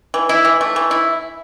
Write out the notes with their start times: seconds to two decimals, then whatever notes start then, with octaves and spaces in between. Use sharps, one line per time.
0.14 E3
0.29 E4
0.45 E3
0.61 A3
0.76 E3
0.91 E4